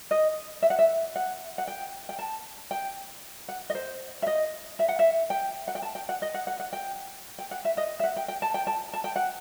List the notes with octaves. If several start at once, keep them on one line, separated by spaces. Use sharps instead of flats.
D#5
E5
F#5
E5
F#5
F#5
G5
G5
A5
G5
F#5
D#5
C5
E5
D#5
E5
F#5
E5
G5
F#5
G5
A5
G5
F#5
D#5
F#5
F#5
F#5
G5
G5
F#5
E5
D#5
E5
F#5
G5
G5
A5
G5
A5
A5
G5
F#5